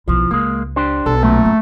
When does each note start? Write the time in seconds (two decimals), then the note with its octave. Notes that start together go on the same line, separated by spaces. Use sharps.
0.08 B1 F3 E4
0.31 C#2 G#3 A#3
0.76 D4 G4 C5
1.06 B1 A4
1.23 F#2 A#2 A3
1.45 A#3